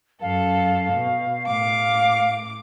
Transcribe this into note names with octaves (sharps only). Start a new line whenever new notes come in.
F#2 A4 F5
B2
A2 F5 D6